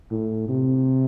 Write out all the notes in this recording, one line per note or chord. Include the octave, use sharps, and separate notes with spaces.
A2
C3